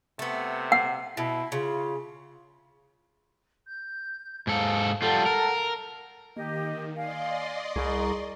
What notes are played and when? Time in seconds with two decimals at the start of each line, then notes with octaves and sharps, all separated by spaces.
0.19 C3 A3 B3
0.72 F#5
1.17 B2 E4
1.52 C#3 F4
3.66 G6
4.47 G#2 A4 F5 D#6
5.02 G3 F4 A4 F#5
5.26 A#4
6.37 D#3 A#3 G4 D#5
6.96 D5 D#5 F5 G#5 C6
7.76 C2 G#4 A#5 C#6